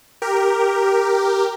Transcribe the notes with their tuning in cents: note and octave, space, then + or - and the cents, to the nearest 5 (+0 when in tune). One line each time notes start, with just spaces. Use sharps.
G4 +0 A#4 +0